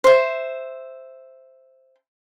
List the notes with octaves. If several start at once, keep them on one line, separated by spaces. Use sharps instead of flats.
C5 E5